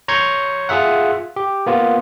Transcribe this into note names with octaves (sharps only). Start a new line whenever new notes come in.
C#5 A#5 C6 G6 G#6 C#7
F4 G#4 E5 F#5
G4
A#3 B3 F4